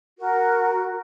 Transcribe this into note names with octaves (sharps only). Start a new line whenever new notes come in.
F#4 A#4